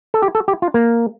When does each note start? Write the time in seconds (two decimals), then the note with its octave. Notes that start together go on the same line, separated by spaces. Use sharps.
0.14 A4
0.23 G4
0.35 A4
0.48 G4
0.62 F4
0.74 A#3